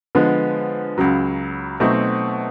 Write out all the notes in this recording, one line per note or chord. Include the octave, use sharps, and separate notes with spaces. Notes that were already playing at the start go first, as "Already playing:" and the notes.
D3 F3 G#3 B3
C#2 C#3 F#3
B2 F#3 A3 C4 D#4